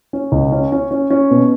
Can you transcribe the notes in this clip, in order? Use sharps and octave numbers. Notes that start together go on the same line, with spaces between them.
C#4
C#2
C#4
C#4
C#4
C#4
B2